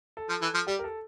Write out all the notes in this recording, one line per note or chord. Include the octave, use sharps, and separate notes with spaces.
A4
F3
E3
F3
G3 G4
A#4
A4